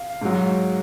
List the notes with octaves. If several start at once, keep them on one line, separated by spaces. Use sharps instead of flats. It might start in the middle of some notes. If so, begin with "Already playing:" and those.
Already playing: F5
G#2 F#3